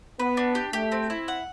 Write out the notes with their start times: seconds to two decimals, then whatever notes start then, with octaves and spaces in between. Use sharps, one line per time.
0.20 B3 B4
0.37 D4
0.55 G4
0.73 A3 G4
0.92 C4
1.10 E4
1.28 F#5